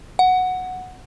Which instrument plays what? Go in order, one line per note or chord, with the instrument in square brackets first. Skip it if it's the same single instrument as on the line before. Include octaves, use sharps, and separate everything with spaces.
[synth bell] F#5